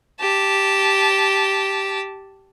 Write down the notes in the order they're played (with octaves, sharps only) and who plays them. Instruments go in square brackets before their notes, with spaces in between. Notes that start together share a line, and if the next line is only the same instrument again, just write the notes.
[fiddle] G4 A5